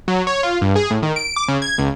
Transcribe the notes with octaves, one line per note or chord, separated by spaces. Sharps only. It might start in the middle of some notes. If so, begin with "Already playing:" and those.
F#3
C#5
F4
G2
G#4
A2
D#3
D7
D6
C#3
G#6
C#2